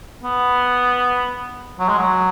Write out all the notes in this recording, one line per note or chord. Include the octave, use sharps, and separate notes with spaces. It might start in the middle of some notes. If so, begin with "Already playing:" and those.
B3
F#3
G#3
F#3